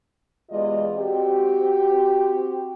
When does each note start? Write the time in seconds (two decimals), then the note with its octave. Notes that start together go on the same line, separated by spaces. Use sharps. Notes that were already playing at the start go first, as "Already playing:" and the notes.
0.50 E2 G#3 F4 G4 D5 D#5
0.95 C4 F#4 G4